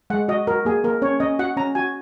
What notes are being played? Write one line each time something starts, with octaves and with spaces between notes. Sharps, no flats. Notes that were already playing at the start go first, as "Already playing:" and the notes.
G#3 F#5
F#4 D#5
F#4 A#4
A#3 G#4
A#3 A#4
C#4 C#5
C#4 D#5
F#4 F#5
C#4 A#5
F#4 G#5